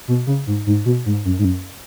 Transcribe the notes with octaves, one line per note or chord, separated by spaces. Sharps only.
B2
C#3
G#2
G#2
B2
G#2
F#2
G#2
F#2